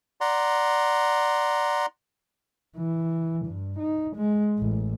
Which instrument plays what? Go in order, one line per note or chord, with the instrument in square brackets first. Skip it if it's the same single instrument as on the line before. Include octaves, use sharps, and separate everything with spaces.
[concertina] D5 F#5 A#5 C6
[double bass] E3
G2
D#4
G#3
A1